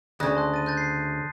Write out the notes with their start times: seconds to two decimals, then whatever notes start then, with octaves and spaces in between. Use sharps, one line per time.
0.20 D2 C#3 D#6 F#6 A#6
0.35 A5 C6 F#6
0.54 A6 D#7
0.66 F#6 G6 A6
0.77 C7